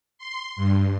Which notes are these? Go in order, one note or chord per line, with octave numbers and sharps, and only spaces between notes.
C6
G2